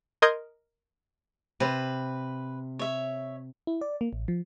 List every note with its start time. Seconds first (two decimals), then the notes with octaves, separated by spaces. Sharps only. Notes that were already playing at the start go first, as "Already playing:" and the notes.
0.22 A#4 D#5 C6 D#6 G6 G#6
1.60 C3 B4
2.79 C#5 E5
3.67 E4
3.81 D5
4.01 A#3
4.13 A1
4.28 F3